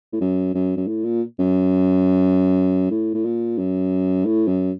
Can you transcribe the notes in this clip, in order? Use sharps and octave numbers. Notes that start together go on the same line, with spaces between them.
A2
F#2
F#2
F#2
A2
A#2
F#2
A2
A2
A#2
F#2
A2
F#2